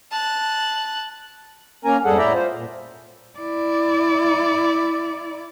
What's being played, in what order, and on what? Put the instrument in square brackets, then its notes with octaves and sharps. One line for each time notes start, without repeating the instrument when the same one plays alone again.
[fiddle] A5 F#6
[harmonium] A#3 C#4 A#4 G#5 A#5
F2 G#2 G3 G#4 A4 F#5
A2 E4 D5 E5 G5 A#5
F4 C5
A#2
[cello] E4 D5